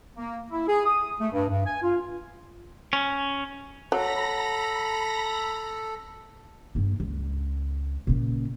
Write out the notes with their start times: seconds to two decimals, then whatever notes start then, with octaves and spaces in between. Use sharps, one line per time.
0.17 A#3
0.51 E4
0.68 G#4
0.85 D#6
1.20 A3
1.33 G2
1.49 G2
1.66 G#5
1.82 F4
2.93 C#4
3.92 F#3 A4 A#5 B5 A#6
6.75 G2 A#3
7.00 C#2
8.07 A#2 C#3